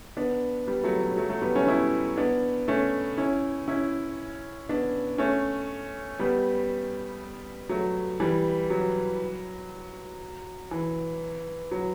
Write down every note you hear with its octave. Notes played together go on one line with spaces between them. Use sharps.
B3 D4
G3 B3
F#3 A3
F#3
F#3 A3
F#3 A3
G3 B3
A3 C#4
C#4 E4
B3 D4
A3 C#4
C#4 E4
C#4 E4
B3 D4
A3 C#4
G3 B3
F#3 A3
E3 G3
F#3
E3
F#3